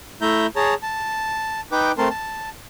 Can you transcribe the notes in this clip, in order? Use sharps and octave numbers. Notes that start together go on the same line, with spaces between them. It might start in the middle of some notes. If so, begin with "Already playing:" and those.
A3 E4 E5 A#5 G6
G#4 C#5 A5 A#5
A5
D#4 B4 G5 D6
A3 C4 A#4 A5 C6
A5